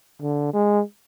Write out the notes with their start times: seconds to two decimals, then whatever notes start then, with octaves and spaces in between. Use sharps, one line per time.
0.22 D3
0.53 G#3